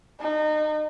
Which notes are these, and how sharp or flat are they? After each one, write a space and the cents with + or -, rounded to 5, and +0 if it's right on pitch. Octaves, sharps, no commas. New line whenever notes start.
D#4 -30